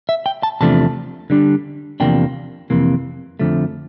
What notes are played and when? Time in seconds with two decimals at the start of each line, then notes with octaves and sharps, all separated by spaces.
0.09 E5
0.26 G5
0.43 A5
0.61 E2 C3 F3 A3 D4 A5
1.30 D3 G3 D4
2.00 E2 C3 F3 A#3 D4 G5
2.70 F2 C3 E3 A#3
3.40 F2 D3 F3 A3